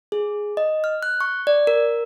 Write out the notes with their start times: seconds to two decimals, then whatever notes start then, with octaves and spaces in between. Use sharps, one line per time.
0.12 G#4
0.57 D#5
0.84 F6
1.03 F#6
1.21 C#6
1.47 D5
1.67 A#4